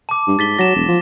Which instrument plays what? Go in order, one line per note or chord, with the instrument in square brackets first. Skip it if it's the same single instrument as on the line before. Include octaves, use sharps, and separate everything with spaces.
[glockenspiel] A5 D6
[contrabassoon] G2
[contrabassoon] G#2 [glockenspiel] A6 B6 G7
[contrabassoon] F#3 [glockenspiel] A#6 E7
[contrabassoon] E1
F3